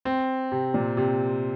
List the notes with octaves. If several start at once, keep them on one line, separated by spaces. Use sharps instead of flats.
C4
C3
A#2
C3